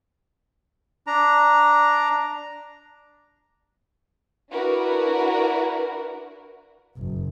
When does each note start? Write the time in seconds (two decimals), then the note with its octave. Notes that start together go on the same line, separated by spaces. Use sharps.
1.07 D4 A#5
4.50 D4 E4 F#4 A#4 B4
6.97 F#1